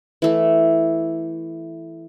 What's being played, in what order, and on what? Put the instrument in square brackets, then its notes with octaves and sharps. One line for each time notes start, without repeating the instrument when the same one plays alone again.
[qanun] E3 A3